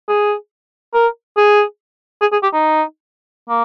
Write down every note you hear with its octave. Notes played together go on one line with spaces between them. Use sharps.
G#4
A#4
G#4
G#4
G#4
G4
D#4
A#3